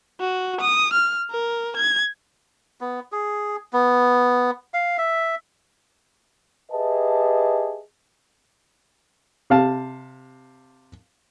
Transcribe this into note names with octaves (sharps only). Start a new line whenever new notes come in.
F#4
D#6
F6
A#4
G#6
B3
G#4
B3
F5
E5
G4 G#4 B4 D#5 E5 A5
C3 F5 A5